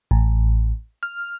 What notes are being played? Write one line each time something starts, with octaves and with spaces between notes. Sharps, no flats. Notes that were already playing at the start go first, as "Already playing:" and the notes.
A1
F6